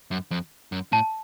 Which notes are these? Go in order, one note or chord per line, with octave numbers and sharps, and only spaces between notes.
F#2
F2
F#2
A2 A5